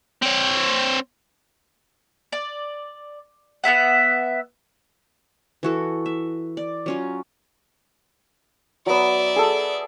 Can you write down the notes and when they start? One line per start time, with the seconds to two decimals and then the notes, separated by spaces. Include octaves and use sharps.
0.22 C4 C#5
2.32 D5
3.64 B3 C#4 E5 F#5
5.63 E3 F#4 A4
6.06 E5
6.57 D5
6.86 F#3 C#4 F4
8.86 F#3 B3 D5 E5
9.36 G#4 A4